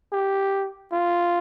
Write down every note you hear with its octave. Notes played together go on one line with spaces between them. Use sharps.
G4
F4